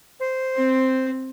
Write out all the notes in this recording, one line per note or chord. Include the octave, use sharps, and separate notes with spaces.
C5
C4